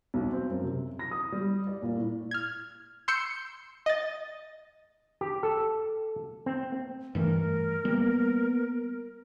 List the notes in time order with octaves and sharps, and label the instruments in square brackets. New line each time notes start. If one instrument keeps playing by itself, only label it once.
[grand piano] B1
C4
F#2
C3
A#6
D#6
G3
D5
A#2
A2
[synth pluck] F6 G#6
C6 E6 G6 C#7
D#5 A6
[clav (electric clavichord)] G4
A4
C4
[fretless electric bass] G2 E3 A3 [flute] A#4
[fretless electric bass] G3 A#3 [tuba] B3